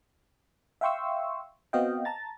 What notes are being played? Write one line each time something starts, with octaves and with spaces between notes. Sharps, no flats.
E5 F5 G5 C6 C#6 E6
B3 C4 F#4 D#5 F5 G5
A5 A#5 A6